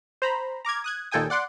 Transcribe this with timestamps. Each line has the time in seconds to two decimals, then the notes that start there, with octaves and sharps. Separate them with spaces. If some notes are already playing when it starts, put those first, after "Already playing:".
0.22 C5 A#5 B5
0.65 A#5 D6 F6 G#6
0.84 D#6 F#6 G#6
1.11 D#2 A#2 A4 G5 G#5 D#6
1.30 D5 F#5 C6 D6